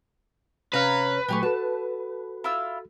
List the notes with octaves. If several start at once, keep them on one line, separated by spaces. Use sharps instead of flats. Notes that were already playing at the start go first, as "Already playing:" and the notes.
C3 C#4 B4 C#5 F5 A#5 F6
A#2 F#3 A3 G4 G#5 C#6
F#4 A4 A5
E4 F4 E6